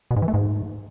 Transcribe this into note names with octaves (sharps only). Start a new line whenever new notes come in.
B2
G#2
E3
A3
G#2